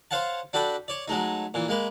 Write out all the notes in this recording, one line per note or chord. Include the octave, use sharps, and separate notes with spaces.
C5 C#5 F5 F#5 A5
D4 F#4 A4 G5 B5
C#5 D5
F#3 G#3 A3 D#4
A#2 E3
G#3 A#3 B4